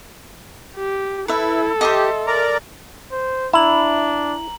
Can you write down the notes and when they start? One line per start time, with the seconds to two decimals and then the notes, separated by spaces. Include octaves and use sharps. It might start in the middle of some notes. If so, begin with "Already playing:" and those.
0.77 G4
1.28 E4 A4 B4 E5
1.81 G4 D#5 E5 C6
2.27 A#4 D5 A#5
3.12 C5
3.53 D4 E4 A#5 F#7